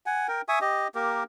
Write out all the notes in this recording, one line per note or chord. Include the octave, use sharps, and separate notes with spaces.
F#5 G#5
A#4 G5
E5 G#5 C#6 D#6
G4 D#5
A#3 G4 A#4